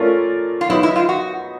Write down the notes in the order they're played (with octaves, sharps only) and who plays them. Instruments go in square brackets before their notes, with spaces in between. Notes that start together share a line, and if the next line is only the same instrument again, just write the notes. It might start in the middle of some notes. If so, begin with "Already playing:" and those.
Already playing: [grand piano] A3 C#4 F4 A#4 D5
[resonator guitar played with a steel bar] F4
[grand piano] F#3 B3 D#4 [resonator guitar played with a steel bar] E4
[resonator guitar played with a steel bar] E4
F4
F#4